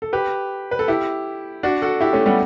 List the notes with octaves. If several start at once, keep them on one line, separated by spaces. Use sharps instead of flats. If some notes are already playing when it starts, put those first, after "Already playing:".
A4
G4 B4
B4
A4
E4 G4
D4 F#4
F#4 A4
E4 G4
A3 C#4
G3 B3